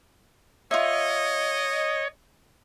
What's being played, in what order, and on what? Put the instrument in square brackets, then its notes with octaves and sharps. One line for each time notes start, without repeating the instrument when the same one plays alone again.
[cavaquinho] F4 E5 [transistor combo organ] C#5 [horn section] D#5